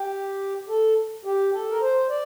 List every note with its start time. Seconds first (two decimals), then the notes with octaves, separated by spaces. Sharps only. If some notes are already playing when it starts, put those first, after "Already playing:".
Already playing: G4
0.69 A4
1.25 G4
1.54 A4
1.70 A#4
1.82 C5
2.10 D5